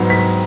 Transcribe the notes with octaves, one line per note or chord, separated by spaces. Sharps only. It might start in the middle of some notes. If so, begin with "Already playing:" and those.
Already playing: G#2 F#3 B3
B6